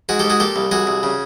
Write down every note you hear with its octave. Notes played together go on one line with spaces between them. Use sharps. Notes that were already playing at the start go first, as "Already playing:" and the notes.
G#2 F#4 G#4
G#2 G4 A4
F#4 G#4
A#2 G4 A4
C2
C2 F#4 G#4
C2
C#3